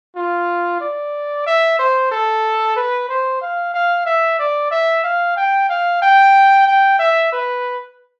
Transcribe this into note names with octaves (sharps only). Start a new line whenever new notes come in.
F4
D5
E5
C5
A4
B4
C5
F5
F5
E5
D5
E5
F5
G5
F5
G5
G5
E5
B4